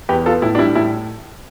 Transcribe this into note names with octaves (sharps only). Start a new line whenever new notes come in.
E2 G4 B4
B3 F4 A4
A2 E4
D4
G3 E4
A2 E4